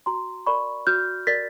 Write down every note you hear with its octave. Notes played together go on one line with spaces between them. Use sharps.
F#4 A#5 C6
A#4 D5 B5 C#6
F#4 F6 G6
A#4 D5 A6 B6